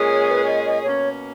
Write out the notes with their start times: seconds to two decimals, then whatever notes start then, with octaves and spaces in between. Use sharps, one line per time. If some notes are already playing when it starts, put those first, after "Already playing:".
Already playing: A#2 G#3 C#4 G#4
0.11 C#5
0.29 B4
0.47 D#5
0.66 D#5
0.84 B2 A#3 C#4 C#5